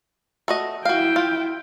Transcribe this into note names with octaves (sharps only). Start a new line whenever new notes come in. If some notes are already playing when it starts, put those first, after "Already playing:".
A3 F#4 D#5
E4 F#4 F5 G5
F4